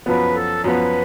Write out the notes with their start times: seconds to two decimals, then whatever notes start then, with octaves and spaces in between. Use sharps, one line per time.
0.06 F#2 F3 B3 B4
0.30 G#4
0.35 A4
0.64 F#2 F3 B3 B4